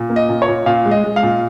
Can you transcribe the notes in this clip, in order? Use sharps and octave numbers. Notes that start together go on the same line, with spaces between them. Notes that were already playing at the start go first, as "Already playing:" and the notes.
Already playing: A#2
A#3
D#5
A#2
C#5
A#2
A#2 F5
G#3
D#5
G#3
F5
A#2